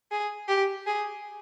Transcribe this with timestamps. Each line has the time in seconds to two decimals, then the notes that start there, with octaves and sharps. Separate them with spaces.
0.11 G#4
0.48 G4
0.87 G#4